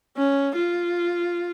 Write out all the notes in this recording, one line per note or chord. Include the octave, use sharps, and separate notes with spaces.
C#4
F4